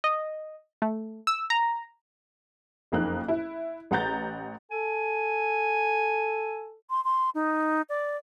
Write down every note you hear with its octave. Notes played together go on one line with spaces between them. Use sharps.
D#5
A3
E6
A#5
F#1 F2 A#3 D#4 F#6
E4
A1 B4 F#5 A#5 G6 A6
A4 G#5
C6
C6
D#4
D5